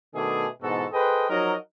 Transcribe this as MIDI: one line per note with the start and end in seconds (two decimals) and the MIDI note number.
0.14 0.46 47
0.14 0.46 51
0.14 0.46 57
0.14 0.46 62
0.14 0.46 68
0.62 0.86 44
0.62 0.86 47
0.62 0.86 52
0.62 0.86 66
0.62 0.86 69
0.93 1.25 68
0.93 1.25 69
0.93 1.25 71
0.93 1.25 72
0.93 1.25 75
0.93 1.25 79
1.29 1.55 53
1.29 1.55 54
1.29 1.55 63
1.29 1.55 66
1.29 1.55 70
1.29 1.55 75